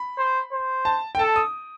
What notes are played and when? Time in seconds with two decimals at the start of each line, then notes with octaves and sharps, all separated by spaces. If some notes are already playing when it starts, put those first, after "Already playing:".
Already playing: B5
0.18 C5
0.52 C5
0.85 A5
1.15 G5
1.19 A4 A5
1.36 D#6